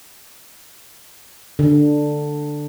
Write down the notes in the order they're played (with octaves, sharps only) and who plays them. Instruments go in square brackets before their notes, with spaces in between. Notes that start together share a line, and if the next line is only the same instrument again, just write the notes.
[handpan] D3